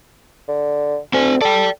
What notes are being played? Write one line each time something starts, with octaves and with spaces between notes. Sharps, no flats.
D3
D2 C4 G#5
A4 D5 G5